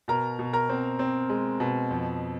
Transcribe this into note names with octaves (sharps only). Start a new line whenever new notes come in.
B2 A#4 A#5
B2
A#4 A#5
C4
C4
G#3
B2
F2